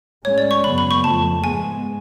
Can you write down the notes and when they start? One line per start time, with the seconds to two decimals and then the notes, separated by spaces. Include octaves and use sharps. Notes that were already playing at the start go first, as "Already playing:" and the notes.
0.24 A2 G#3 C#4 C#5
0.38 D5
0.51 C#6
0.64 F#2 C#3 F#3 B3 B5
0.78 B5
0.91 C#6
1.03 F2 F3 A3 A5
1.44 G#2 G#3 B3 G#5